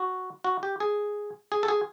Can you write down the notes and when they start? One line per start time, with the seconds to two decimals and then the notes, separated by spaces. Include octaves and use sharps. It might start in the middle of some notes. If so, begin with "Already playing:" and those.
Already playing: F#4
0.44 F#4
0.63 G4
0.80 G#4
1.52 G#4
1.63 A4
1.68 G#4